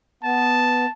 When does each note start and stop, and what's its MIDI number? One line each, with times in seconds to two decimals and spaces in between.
0.23 0.86 59
0.23 0.92 81